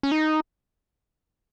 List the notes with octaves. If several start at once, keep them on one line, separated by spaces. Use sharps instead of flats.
C#4
D#4